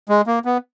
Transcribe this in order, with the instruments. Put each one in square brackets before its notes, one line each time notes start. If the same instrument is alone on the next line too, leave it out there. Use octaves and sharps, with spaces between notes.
[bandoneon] G#3
A#3
B3